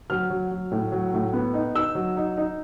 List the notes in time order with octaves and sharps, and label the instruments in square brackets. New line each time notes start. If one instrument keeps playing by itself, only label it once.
[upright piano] F#3 F6
F#3
F#3
A2
F#3
A2
B3
D#4
D#4 E6
F#3
D#4
D#4